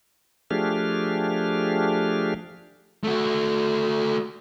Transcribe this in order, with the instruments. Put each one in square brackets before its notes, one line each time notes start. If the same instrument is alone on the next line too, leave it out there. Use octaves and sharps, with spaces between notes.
[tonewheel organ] F3 A3 D4 G4 G#4 F6
[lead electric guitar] A3 F#4